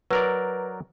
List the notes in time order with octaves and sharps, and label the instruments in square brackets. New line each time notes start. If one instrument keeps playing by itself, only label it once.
[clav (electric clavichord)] F#3 A#4 D5 [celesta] B4